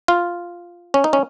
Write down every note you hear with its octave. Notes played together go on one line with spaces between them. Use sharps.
F4
C#4
D#4
C#4